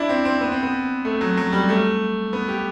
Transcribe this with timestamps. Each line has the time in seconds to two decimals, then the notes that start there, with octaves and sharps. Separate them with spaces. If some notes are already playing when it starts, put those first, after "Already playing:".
Already playing: D4 E4
0.09 C4
0.25 C4
0.41 B3
0.52 C4
0.63 B3
1.05 A3
1.21 F#3
1.37 F#3
1.53 G3
1.69 A3
2.33 B3
2.49 G4